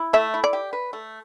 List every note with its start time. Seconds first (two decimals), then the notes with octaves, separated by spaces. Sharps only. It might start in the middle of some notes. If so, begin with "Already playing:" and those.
Already playing: E4
0.13 A3 E5
0.34 E4
0.44 D5
0.53 G4
0.73 B4
0.93 A3